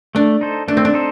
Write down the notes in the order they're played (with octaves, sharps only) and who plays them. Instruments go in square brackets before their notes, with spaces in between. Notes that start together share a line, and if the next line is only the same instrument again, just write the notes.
[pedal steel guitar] A3 [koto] D4
[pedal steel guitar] D#4 A4 C5
[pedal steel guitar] A3 [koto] D4
[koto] C4
D4
[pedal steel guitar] D#4 A4 C5